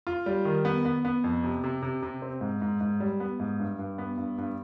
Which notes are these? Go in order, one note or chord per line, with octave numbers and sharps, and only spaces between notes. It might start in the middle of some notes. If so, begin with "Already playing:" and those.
F4
G3
D#3
B3
B3
B3
F2
C3
C3
C3
C3
C4
G#2
G#2
G#2
G3
B3
G#2
G2
G2
B3
G2
G2